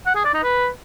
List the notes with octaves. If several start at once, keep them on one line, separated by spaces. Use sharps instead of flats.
F#5
G#4
D5
D#4
B4